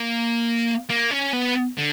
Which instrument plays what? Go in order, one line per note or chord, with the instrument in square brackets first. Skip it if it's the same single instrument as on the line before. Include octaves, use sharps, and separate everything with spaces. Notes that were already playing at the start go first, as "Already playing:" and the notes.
Already playing: [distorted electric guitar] A#3
A#3
C#4
B3
D3